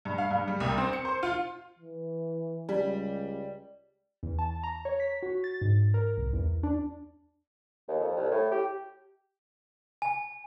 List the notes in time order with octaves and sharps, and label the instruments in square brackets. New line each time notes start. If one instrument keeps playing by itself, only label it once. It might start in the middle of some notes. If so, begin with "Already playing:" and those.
[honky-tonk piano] G2
F5
G2
G3
C2
C4
C#7
C5
F4
[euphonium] E3
[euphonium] C#2 [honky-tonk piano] G3
[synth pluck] E2
A5
A#5
C#5
B6
F#4
A6
G#2
A#4
C2
E2
D4
[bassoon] D#2
F2
C2
A2
G4
[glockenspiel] G#5